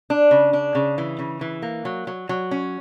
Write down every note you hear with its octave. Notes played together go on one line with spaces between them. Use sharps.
D4
C#3
D4
C#3
E3
C#3
E3
A#3
F#3
F#3
F#3
C#4